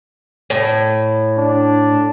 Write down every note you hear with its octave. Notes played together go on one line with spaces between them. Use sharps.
A2
D4